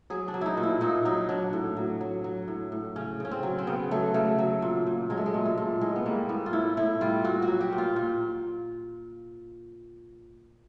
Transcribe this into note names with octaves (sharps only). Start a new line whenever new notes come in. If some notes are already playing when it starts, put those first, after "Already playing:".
F#3 G#4
D4
F#3
D#4 E4
A#2
E4
A#2 D#4
F#3 D#4
F#3 D4
A2
F#3
F#3
F#3
A2
A2
C#3 C#4
C#3 C#4
C4
F#3
C4
C#3 B3
F#3 A3
C#3 A3
F#3
A#2
A#2
F#3 G#3
A3
G#3
A#2
A3
A#2
A2 G#3
B3
G3 A#3
A2 B3
F4
A2 E4
A2 E4
G3 F4
A#2 F#4
F#4
F#3
G4
A#2
F4
A#2